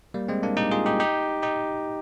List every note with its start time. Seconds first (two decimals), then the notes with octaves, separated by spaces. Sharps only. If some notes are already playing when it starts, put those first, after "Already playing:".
0.14 G3 A#3
0.28 G#3 C4
0.43 A#3 D4
0.57 D#4 G4
0.71 F4 G#4
0.86 D#4 G4
1.00 D#4 G4
1.42 D#4 G4